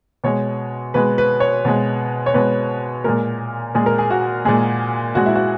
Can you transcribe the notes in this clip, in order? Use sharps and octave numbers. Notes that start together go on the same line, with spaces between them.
B2 G#3 C#5
B2 G#3 B4
B4
C#5
B2 G#3
C#5
B2 G#3 B4
A#2 G#3 A#4
A#2 G#3 G#4
A#4
G#4
F#4
A#2 G#3 G#4
A#2 G#3 F#4
E4
F#4